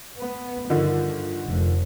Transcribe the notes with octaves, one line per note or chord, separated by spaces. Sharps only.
B3
G2 D3 D#3 F3
F1